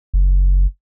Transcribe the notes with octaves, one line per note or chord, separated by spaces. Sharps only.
F#1